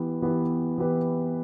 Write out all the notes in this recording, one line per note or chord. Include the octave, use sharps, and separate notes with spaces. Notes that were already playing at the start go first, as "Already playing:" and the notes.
Already playing: E3 B3 E4 G4 B4
E3 B3 E4 G4 B4
E3 B3 E4 G4 B4